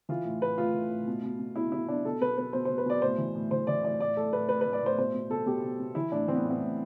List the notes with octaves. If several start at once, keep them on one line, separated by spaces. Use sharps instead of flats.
E3 F4
A2
A2 B4
A2 F4
A2
A2
B2
B2
B2
B2 E4
B2 E4
B2 D4
B2 A4
B2 B4
B2 B4
B2 C5
B2 C5
B4
B2 D5
A2 C5
E3
A2
E3 C5
E3 D5
A2 D5
A2 D5
A2 A4
A2 B4
A2 B4
A2 B4
D5
A2 C5
B2 C5
B2
B2 A4
B2 G4
B2
B2
E3 E4
A2 D4
E3 C4
B3
A2
B3
A2